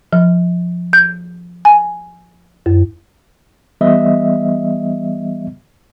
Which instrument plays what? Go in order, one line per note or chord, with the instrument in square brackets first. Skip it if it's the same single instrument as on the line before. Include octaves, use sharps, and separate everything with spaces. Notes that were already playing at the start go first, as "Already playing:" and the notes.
[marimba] F3
G6
G#5
F#2
[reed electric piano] E3 G3 B3 D#5 E5